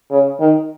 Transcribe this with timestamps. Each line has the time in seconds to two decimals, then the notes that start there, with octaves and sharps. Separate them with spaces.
0.11 C#3
0.40 D#3